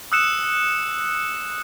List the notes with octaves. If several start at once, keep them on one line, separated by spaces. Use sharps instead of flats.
D#6 E6 F#6 C#7 E7